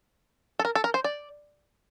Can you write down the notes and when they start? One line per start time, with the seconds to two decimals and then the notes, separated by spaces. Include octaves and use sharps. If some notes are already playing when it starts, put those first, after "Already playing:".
0.59 A4
0.65 A#4
0.75 A4
0.84 A#4
0.94 C5
1.04 D5